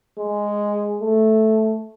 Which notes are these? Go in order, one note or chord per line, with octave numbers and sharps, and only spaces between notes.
G#3
A3